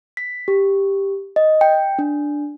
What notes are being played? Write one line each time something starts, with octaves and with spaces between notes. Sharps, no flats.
B6
G4
D#5
G5
D4